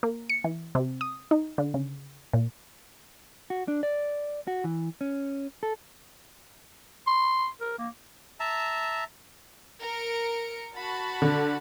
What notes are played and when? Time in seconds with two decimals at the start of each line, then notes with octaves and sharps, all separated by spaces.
0.03 A#3
0.30 C#7
0.44 E3
0.75 C3
1.01 D#6
1.31 D#4
1.58 D3
1.74 C#3
2.33 A#2
3.50 F#4
3.68 D4
3.83 D5
4.47 F#4
4.64 E3
5.01 C#4
5.63 A4
7.07 C6
7.61 A#4
7.79 A#3
8.40 E5 A5 A#5
9.82 A#4 C#7 D7
10.76 F#4 A5 B5
11.22 D3